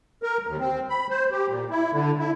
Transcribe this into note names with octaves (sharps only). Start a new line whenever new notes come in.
A#4
D#2
C4
B5
C5
G4
A#2
E4
D3
E4